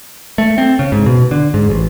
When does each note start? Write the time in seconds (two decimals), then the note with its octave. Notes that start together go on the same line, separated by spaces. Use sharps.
0.38 A3
0.58 C4
0.79 C#3
0.92 G#2
1.06 B2
1.31 D3
1.54 G#2
1.70 A1